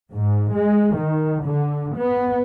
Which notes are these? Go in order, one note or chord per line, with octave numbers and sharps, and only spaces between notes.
G#2
G#3
D#3
D3
B3